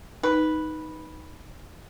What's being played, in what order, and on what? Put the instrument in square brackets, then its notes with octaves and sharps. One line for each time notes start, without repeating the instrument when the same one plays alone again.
[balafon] D#4 [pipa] B4